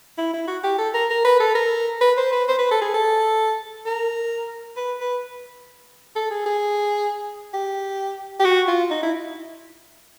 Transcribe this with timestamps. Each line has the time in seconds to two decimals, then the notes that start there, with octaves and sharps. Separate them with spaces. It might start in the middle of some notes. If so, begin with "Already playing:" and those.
0.18 E4
0.33 E4
0.48 F#4
0.64 G4
0.78 A4
0.94 A#4
1.10 A#4
1.25 B4
1.40 A4
1.55 A#4
2.01 B4
2.17 C5
2.33 B4
2.48 C5
2.58 B4
2.71 A4
2.82 G#4
2.94 A4
3.86 A#4
4.77 B4
5.01 B4
6.16 A4
6.31 G#4
6.46 G#4
7.53 G4
8.40 G4
8.45 F#4
8.68 F4
8.91 D#4
9.03 E4